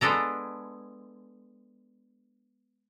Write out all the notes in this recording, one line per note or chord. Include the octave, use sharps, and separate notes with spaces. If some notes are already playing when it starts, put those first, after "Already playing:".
G#3 B3 D4 A4 A#5